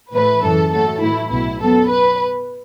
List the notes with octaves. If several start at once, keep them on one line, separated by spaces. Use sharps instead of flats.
A2 E3 A3 B4
F#2 C#3 E3 A4
A2 F#3 A3 A4
A2 E3 A3 E4
B1 B2 B3 E4
F#2 F#3 B3 A4
B4